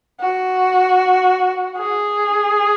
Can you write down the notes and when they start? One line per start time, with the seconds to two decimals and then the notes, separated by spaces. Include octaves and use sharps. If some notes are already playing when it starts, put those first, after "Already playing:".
0.21 F#4
1.78 G#4